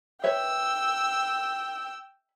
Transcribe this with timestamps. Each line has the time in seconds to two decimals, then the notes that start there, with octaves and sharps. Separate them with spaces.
0.24 B4 C#5 E5 G5 E6